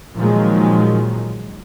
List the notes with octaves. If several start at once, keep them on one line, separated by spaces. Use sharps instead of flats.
A#2 D#3 F3 F#3 G#3